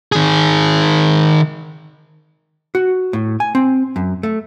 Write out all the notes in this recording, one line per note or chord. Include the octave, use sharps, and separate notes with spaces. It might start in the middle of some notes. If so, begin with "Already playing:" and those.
D#3 G#4
F#4
A2
G#5
C4
F#2
A3